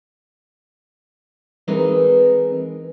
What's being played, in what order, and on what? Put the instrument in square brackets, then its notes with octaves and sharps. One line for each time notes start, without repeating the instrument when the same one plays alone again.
[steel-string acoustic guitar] E3 G#3 C4 D#4 A#4 B4